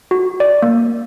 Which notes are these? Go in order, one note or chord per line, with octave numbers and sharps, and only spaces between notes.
F#4
D5
A#3